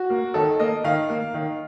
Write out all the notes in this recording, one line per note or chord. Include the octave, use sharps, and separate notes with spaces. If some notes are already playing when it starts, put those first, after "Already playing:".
Already playing: F#4
A#3
D#3 A4
A#3 D#5
D#3 F5
A#3
D#3